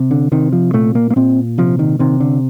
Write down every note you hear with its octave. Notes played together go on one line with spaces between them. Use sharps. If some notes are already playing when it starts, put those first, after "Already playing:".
Already playing: C3
D3
C3 D#3
F3
A#2 A3
A#3
A#3
A#2 C4
C3 F3
D#3
C3 D#3
D3